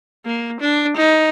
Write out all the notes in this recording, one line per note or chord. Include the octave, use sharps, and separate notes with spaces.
A#3
D4
D#4